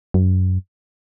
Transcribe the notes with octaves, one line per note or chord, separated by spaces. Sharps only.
F#2